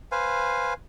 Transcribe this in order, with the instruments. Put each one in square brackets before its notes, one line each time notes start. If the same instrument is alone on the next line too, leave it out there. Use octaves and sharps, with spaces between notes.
[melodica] B4 C5 F5 G#5